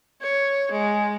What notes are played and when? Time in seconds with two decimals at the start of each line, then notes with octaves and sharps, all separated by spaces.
0.22 C#5
0.71 G#3